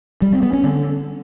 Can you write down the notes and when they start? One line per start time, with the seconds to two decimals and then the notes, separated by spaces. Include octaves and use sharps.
0.22 G3
0.32 C4
0.43 B3
0.53 C#4
0.64 D3